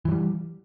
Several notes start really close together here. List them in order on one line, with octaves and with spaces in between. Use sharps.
E3 F#3 G3